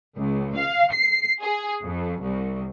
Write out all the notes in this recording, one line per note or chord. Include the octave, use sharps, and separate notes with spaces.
C#2
F5
C7
G#4
F2
C2